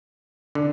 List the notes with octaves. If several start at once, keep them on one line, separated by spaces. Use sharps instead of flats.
D3